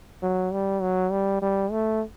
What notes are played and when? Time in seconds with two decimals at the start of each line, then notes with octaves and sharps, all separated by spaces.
0.22 F#3
0.53 G3
0.82 F#3
1.12 G3
1.42 G3
1.71 A3